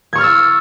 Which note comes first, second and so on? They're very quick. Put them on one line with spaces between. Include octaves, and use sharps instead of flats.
G#6 C#6 F6 A6 E6